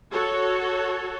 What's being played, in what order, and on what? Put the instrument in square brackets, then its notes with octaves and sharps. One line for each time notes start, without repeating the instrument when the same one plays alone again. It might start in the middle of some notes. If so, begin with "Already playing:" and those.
[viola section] F#4 A4 C#5